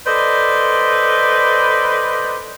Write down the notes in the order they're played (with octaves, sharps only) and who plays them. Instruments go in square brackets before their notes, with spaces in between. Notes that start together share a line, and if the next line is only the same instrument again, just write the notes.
[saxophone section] A4 B4 C5 D5 D#5